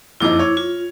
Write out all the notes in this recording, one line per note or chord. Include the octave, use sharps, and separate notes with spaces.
F#1 F2 D#4 E4 D6
C#5
F4